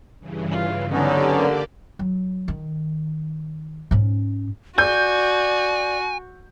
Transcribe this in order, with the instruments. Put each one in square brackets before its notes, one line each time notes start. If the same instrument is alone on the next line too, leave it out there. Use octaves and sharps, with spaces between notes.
[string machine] G2 C#3 E3
[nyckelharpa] F4
[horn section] D3 [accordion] F#3 B3 C#4 [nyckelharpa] D#4 [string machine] G4 D5
[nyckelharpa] A#3
[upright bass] F#3
D#3
G#2 C#4
[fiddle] F#4 [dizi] D5 [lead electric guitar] G#5 [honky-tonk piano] G6